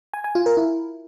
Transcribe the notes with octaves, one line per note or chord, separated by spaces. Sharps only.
G#5
G#5
F4
A#4
E4